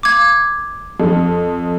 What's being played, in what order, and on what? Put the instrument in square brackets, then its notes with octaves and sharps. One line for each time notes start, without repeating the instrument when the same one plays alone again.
[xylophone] D6 G#6
[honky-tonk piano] F2